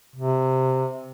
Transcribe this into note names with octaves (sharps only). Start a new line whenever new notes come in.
C3